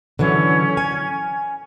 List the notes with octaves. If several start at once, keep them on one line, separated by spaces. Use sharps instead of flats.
D3 E3 F#3 C#4
G#5